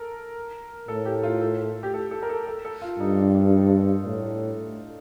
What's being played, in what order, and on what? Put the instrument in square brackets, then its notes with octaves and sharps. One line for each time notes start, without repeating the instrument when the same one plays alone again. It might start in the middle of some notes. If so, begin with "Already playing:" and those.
Already playing: [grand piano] A4 A#4
[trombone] A2 [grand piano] A4
[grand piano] G4
F4
A4
G4
A4
A4
A#4
A4
A4
A4
F4
[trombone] G2 [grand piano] D#4
[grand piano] D4
D4
[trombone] A2